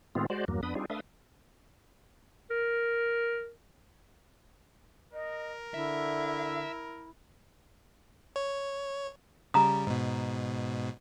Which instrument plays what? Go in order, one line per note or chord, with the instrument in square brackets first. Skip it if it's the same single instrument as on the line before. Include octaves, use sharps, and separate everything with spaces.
[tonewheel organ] A2 D#3 G#3 B3 C4 F4
G#3 F#4 C5 D5
E2 G2 F#3 A#3
F2 B3 D4 B5 D#6
G3 C4 D4 D#4 F4 G#4
A3 D4 B4 E5 F5 D#6
[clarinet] A#4
[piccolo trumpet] A#4 [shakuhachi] D#5
[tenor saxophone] D3 [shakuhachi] E4 [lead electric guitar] E5
[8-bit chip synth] C#5
[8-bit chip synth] C#3 G3 [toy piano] A#5 D#6
[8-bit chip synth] G#2 B2